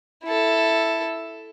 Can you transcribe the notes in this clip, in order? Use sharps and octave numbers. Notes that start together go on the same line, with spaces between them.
E4 A4